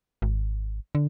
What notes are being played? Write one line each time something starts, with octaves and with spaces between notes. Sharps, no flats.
G#1
D3